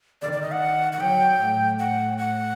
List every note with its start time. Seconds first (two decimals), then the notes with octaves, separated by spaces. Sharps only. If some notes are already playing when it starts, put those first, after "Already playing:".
0.22 D#3 D5
0.33 D5
0.42 D#5
0.52 F#5
0.93 F#5
1.00 F#3 G5
1.40 A2
1.79 F#5
2.18 F#5